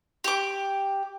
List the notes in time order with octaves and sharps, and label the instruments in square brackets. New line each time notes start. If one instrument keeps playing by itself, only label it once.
[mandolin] G4 D6